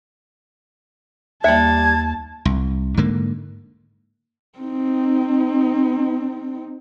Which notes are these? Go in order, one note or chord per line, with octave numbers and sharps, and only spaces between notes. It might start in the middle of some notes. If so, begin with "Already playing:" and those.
D#2 G3 A#3 E5 A5 G#6
C2
G#2 D3 A#3
C4 D#4